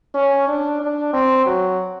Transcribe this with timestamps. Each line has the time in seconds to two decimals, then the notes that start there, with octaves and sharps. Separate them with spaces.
0.14 C#4
0.48 D4
0.81 D4
1.13 C4
1.46 F#3